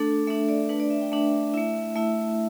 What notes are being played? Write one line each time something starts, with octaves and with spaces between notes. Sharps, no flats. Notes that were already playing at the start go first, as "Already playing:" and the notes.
Already playing: A3 D4 A4
A3 D4 E5
D5
A3 D4 B4
D5
E5
G5
A3 D4 E5
A3 E4 E5
A3 E4 E5